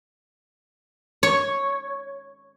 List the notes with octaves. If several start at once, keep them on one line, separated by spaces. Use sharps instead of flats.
C#5